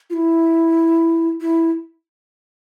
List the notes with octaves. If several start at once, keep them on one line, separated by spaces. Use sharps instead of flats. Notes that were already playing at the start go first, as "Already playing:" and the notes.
F4
E4
E4